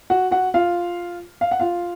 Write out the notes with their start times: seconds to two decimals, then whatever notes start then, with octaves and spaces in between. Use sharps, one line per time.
0.10 F#4 F#5
0.31 F#4 F#5
0.54 F4 F5
1.41 F5
1.51 F#5
1.60 F4 F5